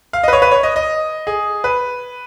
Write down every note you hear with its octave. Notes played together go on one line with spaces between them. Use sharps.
F5
B4 D#5
C#5
B4
C#5
D#5
D#5
G#4
B4